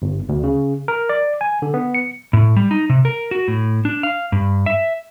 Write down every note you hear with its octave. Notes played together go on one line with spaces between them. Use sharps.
G1
D2
C#3
A#4
D5
G#5
D3
B3
C#7
A2
G3
D#4
C3
A#4
F#4
A2
D4
F5
G2
E5